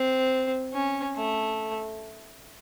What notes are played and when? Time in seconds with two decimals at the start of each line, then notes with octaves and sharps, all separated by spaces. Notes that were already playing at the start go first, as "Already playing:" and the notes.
Already playing: C4
0.74 C#4
1.15 A3